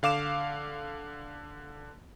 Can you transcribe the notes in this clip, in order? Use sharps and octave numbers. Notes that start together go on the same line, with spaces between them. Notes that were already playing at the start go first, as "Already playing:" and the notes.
D3 F5 D6 E7